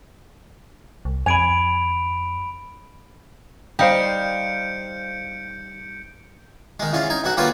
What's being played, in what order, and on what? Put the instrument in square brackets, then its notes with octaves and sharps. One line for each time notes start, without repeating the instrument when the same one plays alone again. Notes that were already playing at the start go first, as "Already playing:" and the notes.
[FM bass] C2
[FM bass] F2 [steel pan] G#5 [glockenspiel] B5 D7 F7
[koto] G3 D#4 [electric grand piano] C5 F5 G5 [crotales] G6 C#7 D7
[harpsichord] D#3 G#3
E2 C#4 F4
D#4 G#5
B1 F#3 F#4
D3 G3 A#3 F4 B4 C#5